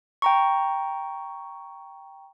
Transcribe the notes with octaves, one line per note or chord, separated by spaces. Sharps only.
G5 A#5 C#6